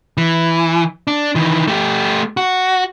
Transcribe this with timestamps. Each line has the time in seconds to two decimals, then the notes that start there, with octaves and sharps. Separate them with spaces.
0.17 E3
1.07 D4
1.35 D#3 E3
1.67 A3 G4
2.37 F#4